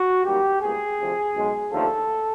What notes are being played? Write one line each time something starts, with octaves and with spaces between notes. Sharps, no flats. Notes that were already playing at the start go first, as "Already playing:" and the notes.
Already playing: F#4
F#2 D#3 G3 A#3 G4
C#2 B2 G3 A#3 G#4
D2 C3 F3
B1 B2 G#3
D#2 D3 F3 A3 A4